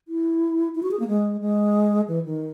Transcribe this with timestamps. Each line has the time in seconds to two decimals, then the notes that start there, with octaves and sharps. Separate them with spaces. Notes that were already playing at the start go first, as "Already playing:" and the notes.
0.08 E4
0.75 E4
0.83 F#4
0.91 G#4
1.00 A#3
1.08 G#3
1.41 G#3
2.08 E3
2.25 D#3